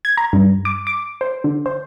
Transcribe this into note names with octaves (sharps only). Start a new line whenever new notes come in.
G#6
A#5
G2
D6
D6
C5
D3
C5